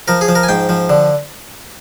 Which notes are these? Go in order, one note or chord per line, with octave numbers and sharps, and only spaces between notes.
F3 A#4
G#4
F3
A#4
G#5
G#2 G5
F3
D3